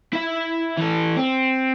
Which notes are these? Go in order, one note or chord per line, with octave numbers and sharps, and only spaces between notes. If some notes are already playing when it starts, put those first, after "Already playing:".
E4 E5
E3 A4
C4